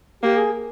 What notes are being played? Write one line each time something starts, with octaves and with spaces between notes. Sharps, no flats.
A#3 G4
G#4